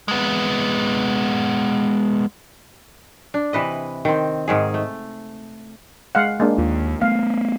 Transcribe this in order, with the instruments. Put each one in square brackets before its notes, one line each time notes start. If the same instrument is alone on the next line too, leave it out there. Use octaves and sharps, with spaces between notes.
[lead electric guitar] G#3 B3
[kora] D4
C3 E3 B4 D#5
D#3 C4
G#2 D#3 G#4
A3
[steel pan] G#3 F5 F#5
G#3 A#3 D4
[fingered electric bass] D#2 [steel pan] F4
[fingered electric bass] A3 B3 [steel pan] F5